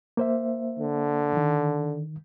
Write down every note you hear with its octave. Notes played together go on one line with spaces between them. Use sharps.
A#3 C5 E5
D3
D#3